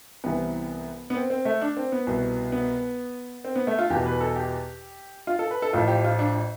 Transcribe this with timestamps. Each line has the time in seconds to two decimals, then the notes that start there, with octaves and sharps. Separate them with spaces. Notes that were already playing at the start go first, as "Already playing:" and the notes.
0.24 C2 C3 E3 B3
1.10 B3
1.15 C4
1.30 C4
1.45 A3
1.61 D4
1.77 C4
1.92 B3
2.07 C2 B2
2.52 B3
3.44 C4
3.56 B3
3.67 A3
3.79 F4
3.90 E2 B2 G4
4.06 B4
4.21 A4
4.36 G4
5.27 F4
5.39 A4
5.51 B4
5.62 A4
5.73 A1 A2 F3 F4
5.88 G4
6.04 F4
6.19 D4